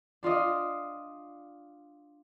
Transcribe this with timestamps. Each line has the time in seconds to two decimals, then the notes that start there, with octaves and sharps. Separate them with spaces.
0.23 D4 F4 D5 D#5